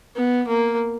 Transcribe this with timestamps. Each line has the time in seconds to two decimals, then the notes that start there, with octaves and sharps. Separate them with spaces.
0.16 B3
0.48 A#3